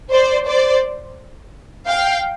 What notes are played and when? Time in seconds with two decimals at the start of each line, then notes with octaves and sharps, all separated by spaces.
0.11 C5 D5
0.47 C5 D5
1.87 F5 G5